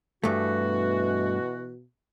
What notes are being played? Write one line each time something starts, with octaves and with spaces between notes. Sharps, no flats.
G2 E3 A3 F#4
B2